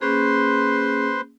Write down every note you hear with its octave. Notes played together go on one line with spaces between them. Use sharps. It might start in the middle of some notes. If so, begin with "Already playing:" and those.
A#3 C#4 G#4 B4 C5 C6